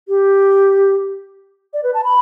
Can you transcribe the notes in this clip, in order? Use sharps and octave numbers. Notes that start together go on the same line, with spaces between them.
G4
D5
B4
A5
B5